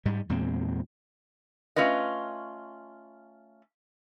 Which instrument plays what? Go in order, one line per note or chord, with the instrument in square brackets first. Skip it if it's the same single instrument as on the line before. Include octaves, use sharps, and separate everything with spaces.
[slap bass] G#2 G3 G#3
E2 A#2 G#3 C4
[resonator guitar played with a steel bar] A3 C#4 F4 B4 D#5